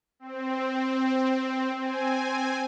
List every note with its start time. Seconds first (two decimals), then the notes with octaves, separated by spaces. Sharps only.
0.19 C4
1.77 C4 G#5